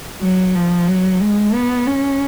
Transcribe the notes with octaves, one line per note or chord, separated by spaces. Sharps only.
F#3
F3
F#3
G#3
B3
C#4